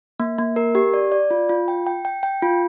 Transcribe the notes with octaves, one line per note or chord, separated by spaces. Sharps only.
A#3
A#3
A#4
G4
D5
D5
F4
F4
G5
G5
G5
G5
F4